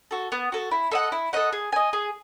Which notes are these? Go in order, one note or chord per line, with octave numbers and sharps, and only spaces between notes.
F#4 A4
B3
F#4 A4
E4
A4 D#5 F#5
E4
A4 D#5 F#5
G#4
D#5 G#5
G#4